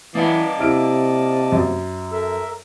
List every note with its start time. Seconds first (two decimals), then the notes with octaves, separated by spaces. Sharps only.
0.15 E3 A#3 D5 D#5 F#5 A5
0.60 C3 E4 F6 D7
1.52 F#2
2.12 A4 A#4 E5